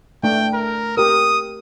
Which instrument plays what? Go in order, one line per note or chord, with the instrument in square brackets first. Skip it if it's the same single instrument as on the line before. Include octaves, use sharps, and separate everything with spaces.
[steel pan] A3 D4 [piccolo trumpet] G5
[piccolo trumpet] A#4
[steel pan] G4 A#4 [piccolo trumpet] D#6